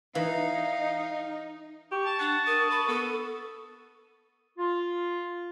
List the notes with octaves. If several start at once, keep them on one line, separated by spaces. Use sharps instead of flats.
E3 D#4 F5
G4 C#6
A5
D4 F#5 A5
A#4 D#6
B5
B3 A4
F4